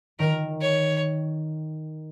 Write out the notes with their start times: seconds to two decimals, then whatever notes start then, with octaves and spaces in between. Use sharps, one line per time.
0.19 D#3 A#4
0.61 C#5